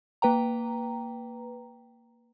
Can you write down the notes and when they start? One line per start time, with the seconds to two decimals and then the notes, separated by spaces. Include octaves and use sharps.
0.22 A#3 B4 G5 A#5